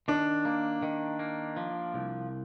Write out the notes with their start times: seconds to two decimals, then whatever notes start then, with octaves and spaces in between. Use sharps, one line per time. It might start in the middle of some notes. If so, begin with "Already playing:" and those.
0.08 D#3 D4
0.45 A#3
0.83 D#3
1.19 A#3
1.57 F3
1.94 C2